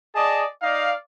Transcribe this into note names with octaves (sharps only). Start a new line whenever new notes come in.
G#4 D5 D#5 A5
D#4 D5 F5